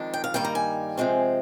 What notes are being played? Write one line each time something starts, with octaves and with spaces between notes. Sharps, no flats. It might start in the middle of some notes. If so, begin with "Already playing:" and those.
Already playing: F2 D#3 G#3 D4
G5
F5
G2 D#3 G3 A#3 G5
A#5
G#5
C3 F3 G#3 C4